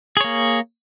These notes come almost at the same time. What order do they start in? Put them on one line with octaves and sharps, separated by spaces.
G#4 C#5 A#3